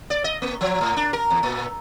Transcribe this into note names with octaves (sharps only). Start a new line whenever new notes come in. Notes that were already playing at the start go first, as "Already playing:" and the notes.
D5
D#5
A#3
F3
A2
D4
A#4
E2
A#2